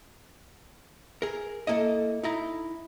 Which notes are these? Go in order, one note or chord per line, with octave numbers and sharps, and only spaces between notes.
G#4 A#4
C#3 A#3 E4 A4 D#5 E5
D#4 E4 A#5